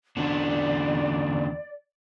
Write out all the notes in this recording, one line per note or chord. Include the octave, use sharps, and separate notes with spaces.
E2 D3 D4 D5